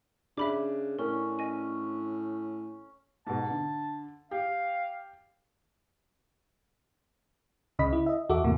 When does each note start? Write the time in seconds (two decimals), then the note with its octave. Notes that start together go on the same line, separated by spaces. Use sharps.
0.37 C#3 D4 E5 B5 D6
0.99 A2 C#4 A#4
1.39 D#5 G#5
3.27 G#2 B2 A5
3.50 D3
4.31 G4 F5
7.79 C#2 C#3 D#5 B5 B6
7.93 E4
8.06 D#5 E5
8.29 E2 F#4 A4 E5 D6
8.44 E2 A2 C3 A#3